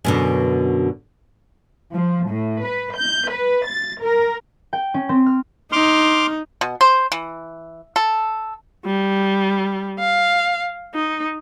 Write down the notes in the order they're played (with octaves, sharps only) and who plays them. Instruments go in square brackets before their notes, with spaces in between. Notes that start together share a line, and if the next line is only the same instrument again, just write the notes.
[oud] F#2 B2 D3
[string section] F3
A2
B4
G6
B4
A6
A#4
[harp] G5
C#4
C4
F6
[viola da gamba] D#4 [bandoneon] C6 D6 F6
[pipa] B2
C5
E3
A4
[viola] G3
F5
D#4